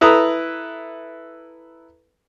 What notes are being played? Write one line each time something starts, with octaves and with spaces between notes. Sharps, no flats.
E4 A4 B4 A#5 D#6